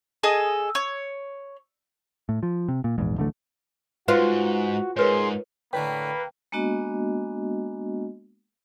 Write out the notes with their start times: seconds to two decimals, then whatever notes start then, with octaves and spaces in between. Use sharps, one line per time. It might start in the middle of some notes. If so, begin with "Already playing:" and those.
0.23 G#4 A4 D#5
0.75 C#5
2.29 A2
2.43 F3
2.68 C3
2.84 A#2
2.98 A#1 E2 G#2
3.16 D1 A1 D3 A3
4.08 G#2 F4 F#4 B4 C5 F5
4.97 G#2 G#4 A#4 B4 C#5 C6
5.73 A2 D3 A3 A#3 B4 G5
6.52 G#3 A#3 B3 D4 F#4 D#5